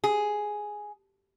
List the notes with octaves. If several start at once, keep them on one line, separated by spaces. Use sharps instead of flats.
G#4